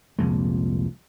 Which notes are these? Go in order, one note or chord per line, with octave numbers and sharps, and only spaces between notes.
C2 F2 A#2 G#3